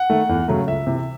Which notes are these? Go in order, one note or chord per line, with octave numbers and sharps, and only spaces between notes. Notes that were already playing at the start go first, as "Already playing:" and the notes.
Already playing: F#5
D#3 A3
E2
C#3 F#3 A3
C#2 E5
C3 E3